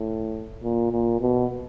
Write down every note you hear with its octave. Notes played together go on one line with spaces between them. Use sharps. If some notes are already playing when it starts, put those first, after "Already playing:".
Already playing: A2
A#2
A#2
B2